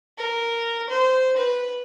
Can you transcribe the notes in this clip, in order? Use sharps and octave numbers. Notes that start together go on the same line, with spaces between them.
A#4
C5
B4